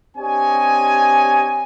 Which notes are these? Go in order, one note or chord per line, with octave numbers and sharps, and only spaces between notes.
C4 D4 G4 C#5 D#5 G#5